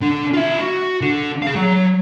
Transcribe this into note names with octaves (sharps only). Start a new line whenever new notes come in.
D4 A4
F4 E5
F#4
D3
G#4 F5
F#3 A#5